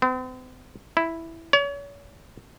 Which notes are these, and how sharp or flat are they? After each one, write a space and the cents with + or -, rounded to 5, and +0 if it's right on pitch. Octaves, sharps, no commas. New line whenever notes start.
C4 -45
E4 +0
C#5 +35